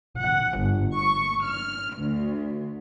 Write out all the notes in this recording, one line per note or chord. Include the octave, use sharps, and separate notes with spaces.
F#5
G1
C#6
F6
D2